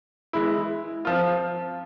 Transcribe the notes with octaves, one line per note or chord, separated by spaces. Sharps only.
E3 G#3 E4
F3 C4 F4